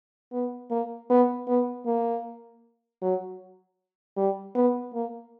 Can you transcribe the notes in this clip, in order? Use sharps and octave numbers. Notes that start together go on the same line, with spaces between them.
B3
A#3
B3
B3
A#3
F#3
G3
B3
A#3